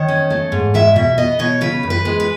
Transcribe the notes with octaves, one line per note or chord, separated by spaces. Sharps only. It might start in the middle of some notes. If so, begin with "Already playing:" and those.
Already playing: D#3 C#5
C#4
A3
G#2
G#3 E5
B2 E5
B3 D#5
B2 C#5
C#3 B4
F#2
B4
G#3
B4